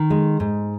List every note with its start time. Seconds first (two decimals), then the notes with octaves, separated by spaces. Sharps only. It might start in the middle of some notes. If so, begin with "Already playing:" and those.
Already playing: D#3
0.10 G#3
0.40 G#2